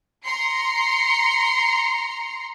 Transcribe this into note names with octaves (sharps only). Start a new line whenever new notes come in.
A#5 C6 C#7